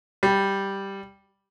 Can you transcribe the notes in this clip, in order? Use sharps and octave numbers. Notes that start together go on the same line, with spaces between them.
G3